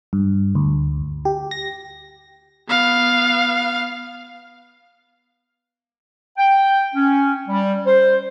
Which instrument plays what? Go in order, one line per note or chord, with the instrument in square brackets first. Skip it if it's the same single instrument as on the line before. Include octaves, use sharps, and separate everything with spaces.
[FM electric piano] G2
D2
G4
A#6
[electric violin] B3 F5
[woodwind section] G5
C#4
G3
C5